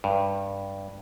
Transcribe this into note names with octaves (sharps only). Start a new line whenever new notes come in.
G2